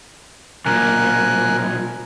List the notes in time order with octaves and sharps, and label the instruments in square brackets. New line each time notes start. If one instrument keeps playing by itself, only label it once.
[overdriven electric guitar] B1 A#2 [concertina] A#4 G#5 F#6